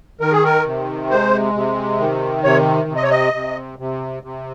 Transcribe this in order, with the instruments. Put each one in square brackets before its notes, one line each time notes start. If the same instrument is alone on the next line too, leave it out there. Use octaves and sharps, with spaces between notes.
[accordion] D#3 A#4
G#4
A#4
C3
G#3 C5
C3
D#3
C3 C#5
C3
D#5
C#5
D#5
C3
C3
C3